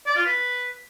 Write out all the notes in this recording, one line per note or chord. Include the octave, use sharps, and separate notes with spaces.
D5
F4
B4